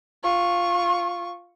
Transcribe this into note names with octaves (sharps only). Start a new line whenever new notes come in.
F4 C#6